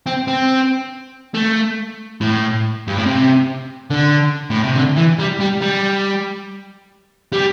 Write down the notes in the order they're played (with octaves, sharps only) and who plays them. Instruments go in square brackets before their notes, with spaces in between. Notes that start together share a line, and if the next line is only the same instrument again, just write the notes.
[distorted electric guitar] C4
C4
A3
A2
G2
A2
C3
D3
A2
C3
D3
E3
G3
G3
G3
G3